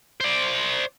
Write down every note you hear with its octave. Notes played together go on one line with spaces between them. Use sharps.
C5 D5